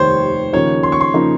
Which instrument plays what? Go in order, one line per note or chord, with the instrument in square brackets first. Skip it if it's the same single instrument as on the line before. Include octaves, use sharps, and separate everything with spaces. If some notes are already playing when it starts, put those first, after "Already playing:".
Already playing: [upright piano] F1 D#2 D#3 G3 [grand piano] C5 C#5
[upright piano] D#2 C#3 F3 A#3 D#4 [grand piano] C#5
[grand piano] C6
C#6
C6
[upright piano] C#3 F3 A#3 D#4